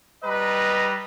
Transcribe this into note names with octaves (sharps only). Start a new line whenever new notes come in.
G3 B4 D#5 A#5